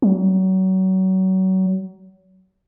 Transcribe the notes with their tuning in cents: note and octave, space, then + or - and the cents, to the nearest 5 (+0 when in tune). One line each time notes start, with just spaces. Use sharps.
F#3 +30